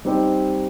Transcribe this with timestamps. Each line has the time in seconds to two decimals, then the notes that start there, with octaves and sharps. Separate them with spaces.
0.05 G3 C4 D#4 G4